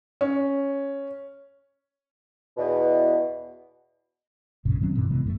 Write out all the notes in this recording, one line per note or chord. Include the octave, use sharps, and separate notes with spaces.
C#4
E2 B2
A#1 F#2 A#2 C#3
D#3 F#3 C4 C#4
F#2 A#2 D#3 E3
C3 E3 G#3 B3
D1 F#2 F3 A3